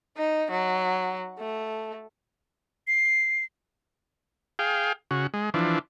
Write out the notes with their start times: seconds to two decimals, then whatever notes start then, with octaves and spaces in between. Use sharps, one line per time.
0.17 D#4
0.51 F#3
1.39 A3
2.88 C7
4.59 G#4 F5 G5
5.11 C#3 F#4
5.34 G#3
5.54 E3 F3 D4